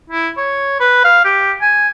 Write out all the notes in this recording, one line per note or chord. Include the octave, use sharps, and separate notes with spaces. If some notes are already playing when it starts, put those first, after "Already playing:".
E4
C#5
B4
F5
G4
G#5